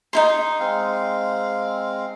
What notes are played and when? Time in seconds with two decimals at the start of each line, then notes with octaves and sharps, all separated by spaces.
0.13 D#4 E4 C6
0.60 G#3 C4 F5